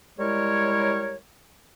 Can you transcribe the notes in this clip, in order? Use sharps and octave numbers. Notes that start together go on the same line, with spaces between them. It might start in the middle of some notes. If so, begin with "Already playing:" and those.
G3 G#3 E4 A#4 C#5